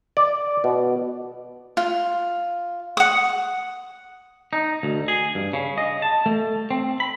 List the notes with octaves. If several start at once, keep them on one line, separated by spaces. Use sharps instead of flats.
D5
B2
F4
F#5 D#6
D#4
D2
G#4
G2
C#3
D#5
A5
A3
C4
B5